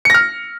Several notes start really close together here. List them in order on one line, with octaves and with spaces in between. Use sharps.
C#7 A#6 F6